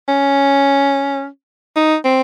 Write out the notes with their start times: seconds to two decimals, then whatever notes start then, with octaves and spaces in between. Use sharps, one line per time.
0.09 C#4
1.76 D#4
2.05 C4